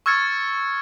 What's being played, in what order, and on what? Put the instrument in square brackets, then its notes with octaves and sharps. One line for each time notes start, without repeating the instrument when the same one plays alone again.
[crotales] C#6 E6 F6 G#6 A6 C#7